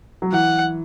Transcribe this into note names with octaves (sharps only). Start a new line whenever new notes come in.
F#3
E3 F#5